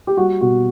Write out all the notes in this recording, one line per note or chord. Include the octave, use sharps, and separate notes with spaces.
G4
G3 F#4
B2 F#4